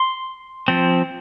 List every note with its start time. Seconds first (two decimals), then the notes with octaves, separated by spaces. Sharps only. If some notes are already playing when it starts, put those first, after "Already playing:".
Already playing: C6
0.68 F3 C4